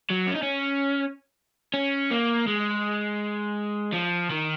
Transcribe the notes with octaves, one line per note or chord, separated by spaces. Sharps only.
F#3
C#4
D#4
C#4
C#4
A#3
G#3
F3
D#3